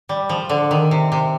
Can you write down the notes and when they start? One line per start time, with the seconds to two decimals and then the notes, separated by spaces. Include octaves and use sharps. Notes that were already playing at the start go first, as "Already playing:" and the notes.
0.09 G3
0.29 F3
0.49 D3
0.71 D#3
0.91 C3
1.12 C3